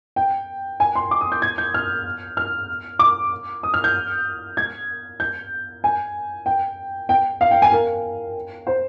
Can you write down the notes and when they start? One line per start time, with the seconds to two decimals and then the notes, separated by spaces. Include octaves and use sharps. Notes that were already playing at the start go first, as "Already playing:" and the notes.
0.16 G5
0.80 G#5
0.95 C6
1.11 D6
1.21 D#6
1.32 G6
1.42 G#6
1.58 G6
1.74 F6
2.37 F6
2.99 D6
3.63 D#6
3.74 F6
3.84 G6
4.57 G#6
5.20 G6
5.84 G#5
6.46 G5
7.09 G5
7.41 F5
7.51 G5
7.62 G#5
7.72 A#4
8.67 C5